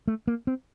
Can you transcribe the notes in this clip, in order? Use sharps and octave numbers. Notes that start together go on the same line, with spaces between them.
A3
A#3
C4